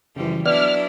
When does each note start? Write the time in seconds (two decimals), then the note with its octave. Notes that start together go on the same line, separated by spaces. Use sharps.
0.16 F#2 C#3 E3 F3 G3
0.46 F#3 B3 D4 E4 D5 F6